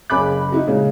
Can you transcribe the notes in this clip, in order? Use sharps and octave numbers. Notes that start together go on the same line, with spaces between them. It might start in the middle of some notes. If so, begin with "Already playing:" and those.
F#1 C#3 G#5 B5 D6 F#6
D#4 E4 F#4
A#2 C#3 G#3